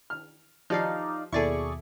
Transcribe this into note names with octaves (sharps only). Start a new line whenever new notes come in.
F6
F3 D#4 G4 D5 F5
D#2 B2 E4 G#4 A4 D5 C#6